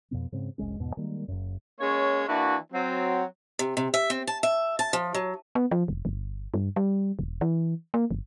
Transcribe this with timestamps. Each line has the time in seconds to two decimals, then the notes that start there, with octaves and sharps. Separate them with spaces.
0.11 F2 B2 B3
0.32 G#2 C#3 C4
0.58 F#1 C2 G#3 C#4
0.80 E2 G#2 B2
0.97 D#3 G3 G#3 A#3
1.28 F#1 F#2
1.79 G#3 A#3 C#4 C#5
2.27 E3 A#3 D4 E4 F#4
2.72 F#3 C4
3.59 C3
3.77 C3
3.94 E5
4.10 C4
4.27 A5
4.43 E5
4.79 A5
4.93 F3
5.15 F#3
5.55 B3
5.71 F3
5.88 F1
6.05 G1
6.54 G2
6.76 G3
7.19 E1
7.41 E3
7.94 A#3
8.11 G1